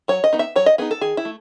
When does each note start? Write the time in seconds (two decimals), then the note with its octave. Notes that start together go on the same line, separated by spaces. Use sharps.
0.08 F#3 C#5
0.24 D#5
0.33 B3 D#4
0.39 E5
0.56 F#3 C#5
0.66 D#5
0.78 B3 D#4 G#4
0.91 A4
1.01 D#3 G#4
1.17 E4
1.25 A3